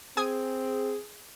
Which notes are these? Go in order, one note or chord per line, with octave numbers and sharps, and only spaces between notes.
C4 G#4 G#5 D#6 G#6